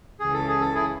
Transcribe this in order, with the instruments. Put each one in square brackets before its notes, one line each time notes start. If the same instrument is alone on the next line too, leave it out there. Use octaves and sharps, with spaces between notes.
[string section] C#2 C#3 E3 [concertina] G#4
[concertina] A4
G#4
A4
E4 G#4